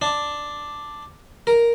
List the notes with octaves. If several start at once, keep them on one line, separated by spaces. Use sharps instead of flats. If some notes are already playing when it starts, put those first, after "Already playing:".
D4
A#4